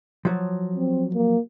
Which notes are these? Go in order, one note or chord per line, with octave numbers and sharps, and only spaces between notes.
F3 F#3
C4
A#3